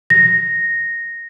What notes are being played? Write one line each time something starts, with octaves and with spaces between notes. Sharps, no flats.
A#6